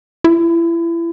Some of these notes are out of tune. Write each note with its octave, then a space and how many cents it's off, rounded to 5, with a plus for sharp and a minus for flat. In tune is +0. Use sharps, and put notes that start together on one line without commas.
E4 +30